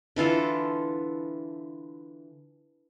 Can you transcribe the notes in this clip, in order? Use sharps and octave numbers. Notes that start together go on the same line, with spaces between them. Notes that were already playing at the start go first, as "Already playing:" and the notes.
D3 E3 F4 A4